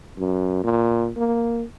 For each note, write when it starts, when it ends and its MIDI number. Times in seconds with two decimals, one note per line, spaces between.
0.18 0.62 42
0.64 1.10 46
1.17 1.64 58